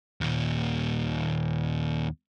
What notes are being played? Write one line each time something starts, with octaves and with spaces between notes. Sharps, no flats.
D#2 A#2